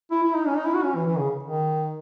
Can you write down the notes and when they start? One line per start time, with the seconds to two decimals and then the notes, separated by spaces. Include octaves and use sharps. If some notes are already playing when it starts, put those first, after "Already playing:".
0.11 E4
0.24 E4
0.35 D#4
0.47 C#4
0.56 D#4
0.65 E4
0.75 F#4
0.84 C#4
0.96 E3
1.07 E3
1.19 C#3
1.43 D#3